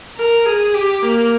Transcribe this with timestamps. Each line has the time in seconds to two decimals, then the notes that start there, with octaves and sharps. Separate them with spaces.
0.17 A#4
0.46 G#4
0.74 G4
1.03 A#3